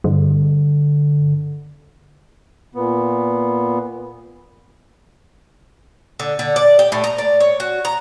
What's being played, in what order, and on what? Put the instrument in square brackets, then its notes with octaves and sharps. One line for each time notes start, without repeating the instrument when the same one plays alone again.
[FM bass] G2 [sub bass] D3
[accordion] A#2 B3
[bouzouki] D3
D3
D5
G4
A2
A#5
D5
C#5
F#4
A#5